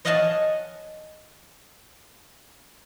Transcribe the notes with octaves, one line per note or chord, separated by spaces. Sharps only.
C#5 D#5 F5 F#5 G#5 A5